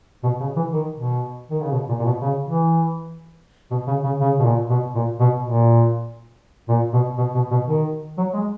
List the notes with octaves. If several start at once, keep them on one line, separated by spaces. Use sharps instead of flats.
B2
C#3
E3
D#3
B2
D#3
C#3
B2
A#2
A#2
B2
C#3
E3
B2
C#3
C#3
C#3
B2
A#2
B2
A#2
B2
A#2
A#2
B2
B2
B2
B2
D#3
F#3
G#3